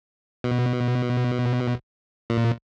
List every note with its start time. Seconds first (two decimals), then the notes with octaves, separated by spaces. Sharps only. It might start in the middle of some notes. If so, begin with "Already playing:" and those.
0.44 B2
2.30 A#2